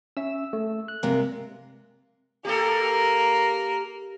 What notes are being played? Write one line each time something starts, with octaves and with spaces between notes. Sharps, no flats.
C#4 E5 E6
A3
F#6
G2 C3 G#3 A#3
A#3 G4 A4 A#4